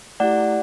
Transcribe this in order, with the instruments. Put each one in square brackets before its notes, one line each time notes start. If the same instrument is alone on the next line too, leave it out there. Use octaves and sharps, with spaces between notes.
[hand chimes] A3 E4 G4 D5 F#5